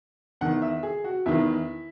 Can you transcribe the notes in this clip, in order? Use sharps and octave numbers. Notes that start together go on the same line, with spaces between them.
E2 D#3 F#5
E5
G#4
F#4
E2 D#3 E4